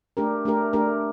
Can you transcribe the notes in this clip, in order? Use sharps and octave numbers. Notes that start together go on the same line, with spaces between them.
A3 D4 G4 A#4
A3 D4 G4 A#4
A3 D4 G4 A#4